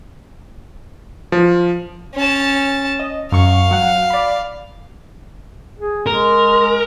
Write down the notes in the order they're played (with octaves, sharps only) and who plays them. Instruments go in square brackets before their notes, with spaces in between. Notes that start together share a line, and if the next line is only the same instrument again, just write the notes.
[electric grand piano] F3
[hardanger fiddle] C#4 A5
[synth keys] D#5
[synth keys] F#2 C#6 [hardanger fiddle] F5
[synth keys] F#3 F#5
D5 B5
[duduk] G#4
[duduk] G#3 [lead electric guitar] A#4